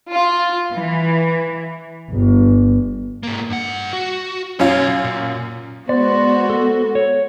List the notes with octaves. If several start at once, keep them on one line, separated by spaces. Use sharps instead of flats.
F4
E3
G1
G#2 A#3
G2 F#5
F#4
B1 F#2 C#4 F4 C#5
A#2
G#3 B3 F#4 C5 D5
A4
C#5